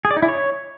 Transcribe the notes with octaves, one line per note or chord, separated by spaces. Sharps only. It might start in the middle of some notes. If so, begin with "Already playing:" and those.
G#4
D5
D#4
E4
C#5